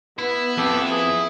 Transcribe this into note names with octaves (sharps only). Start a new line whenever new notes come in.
B3 E4
F2 G4 A4
G#4